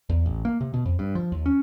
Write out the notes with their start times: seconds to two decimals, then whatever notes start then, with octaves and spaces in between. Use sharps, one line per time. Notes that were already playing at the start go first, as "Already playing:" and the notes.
0.09 E2
0.26 A1
0.45 A#3
0.61 C3
0.74 B2
0.85 F2
0.99 G2
1.15 F3
1.32 D#2
1.46 C#4